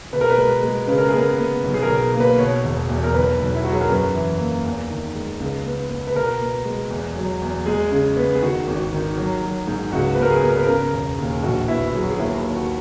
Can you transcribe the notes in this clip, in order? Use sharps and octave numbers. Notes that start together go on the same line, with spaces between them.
B2 B4
A#4
B4
G#3
G#3
C#3 B4
A#4
G#4
B3 A#4
B3
B1
G#4
A#4
B2
A#3
B4
B2 C#5
E1
E2
A#4
B1 B4
B1
E4
F#3 F#4
G#4
A#4
F#2 B4
E3
A#3
E2
D#3
G#3
C#2
B3
B3
B4
B2 A#4
B3
G#3
E2
F#3
E2
G#3 G#4
C#3
B3
G#4
D#3 F#4
G#1
D#3
F#3
F#3
G#2
C#2 F#4
B3 B4
A#4
G#4
B3
A#4
B4
C#3 A#4
E1
D#2
A#1 F#4
B3 E4
F#3 G#4
F#4
G#4
D#2 E4
D#2
F#4